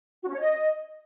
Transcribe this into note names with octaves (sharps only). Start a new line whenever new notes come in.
F#4
C#4
C#5
D#5